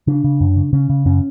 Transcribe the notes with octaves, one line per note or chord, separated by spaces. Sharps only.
C#3 D4
C#3
F#2
C#3
C#3 C#4
C#3
F#2 C#4